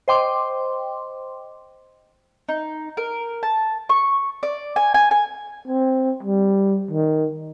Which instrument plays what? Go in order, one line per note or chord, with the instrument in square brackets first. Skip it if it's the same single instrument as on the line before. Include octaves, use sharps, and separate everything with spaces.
[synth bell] C5 D#5 G5 C6 D6
[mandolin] D#4
A#4
A5
C#6
D5
G#5
G#5
G#5
[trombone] C4
G3
D#3